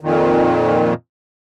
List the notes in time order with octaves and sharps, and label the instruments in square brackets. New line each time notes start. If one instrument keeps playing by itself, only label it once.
[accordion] F2 A#2 D#3